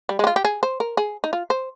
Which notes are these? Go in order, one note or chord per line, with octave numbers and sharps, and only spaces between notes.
G3
G#3
G4
F4
G4
G#4
C5
A#4
G#4
D#4
F4
C5